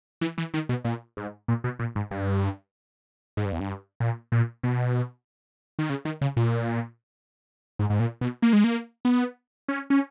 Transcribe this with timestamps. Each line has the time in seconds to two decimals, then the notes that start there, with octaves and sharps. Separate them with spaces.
0.21 E3
0.38 E3
0.54 D#3
0.69 B2
0.85 A#2
1.17 G#2
1.48 A#2
1.64 B2
1.79 A#2
1.96 G#2
2.11 G2
3.37 G#2
3.45 G2
3.52 E2
3.60 G2
4.00 A#2
4.32 A#2
4.63 B2
5.79 D#3
5.90 C#3
6.05 D#3
6.21 C#3
6.37 A#2
7.79 G#2
7.90 G#2
8.00 A#2
8.21 B2
8.42 A#3
8.53 G#3
8.64 A#3
9.05 B3
9.68 C#4
9.90 C#4